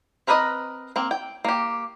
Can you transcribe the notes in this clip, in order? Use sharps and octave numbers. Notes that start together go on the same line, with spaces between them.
C4 A#4 B4 D5 D#5
A#3 C4
G5
A#3 G4